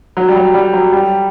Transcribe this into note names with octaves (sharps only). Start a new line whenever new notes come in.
F#3
G3
F#3
G3
F#3
G3